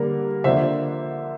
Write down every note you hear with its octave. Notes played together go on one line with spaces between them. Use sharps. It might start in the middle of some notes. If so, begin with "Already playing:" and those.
Already playing: D3 G3 A#3 A#4
D3 F3 A#3 D4 C5 E5